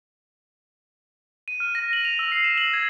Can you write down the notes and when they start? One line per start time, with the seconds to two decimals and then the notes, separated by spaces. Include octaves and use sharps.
1.48 D#7
1.60 F6
1.75 A#6
1.93 F#7
2.05 F7
2.19 E6
2.32 C7
2.44 E7
2.58 F#7
2.73 G#6